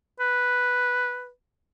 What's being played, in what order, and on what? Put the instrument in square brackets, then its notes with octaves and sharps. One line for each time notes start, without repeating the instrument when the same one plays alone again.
[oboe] B4